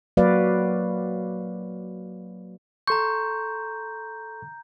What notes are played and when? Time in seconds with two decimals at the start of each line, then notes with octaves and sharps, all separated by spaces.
0.17 F#3 A#3 F#4 B4 D5 F5
2.87 A4 A#5 C6 C#6 G6